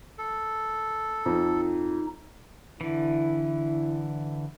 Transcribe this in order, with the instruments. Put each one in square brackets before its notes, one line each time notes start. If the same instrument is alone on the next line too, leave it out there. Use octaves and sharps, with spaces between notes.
[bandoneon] A4
[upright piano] F2 [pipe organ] D#4
[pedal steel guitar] D3 E3 [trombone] E4